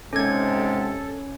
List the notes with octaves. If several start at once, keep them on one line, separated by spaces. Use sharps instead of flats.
G#2 C3 C#4 A4 G#6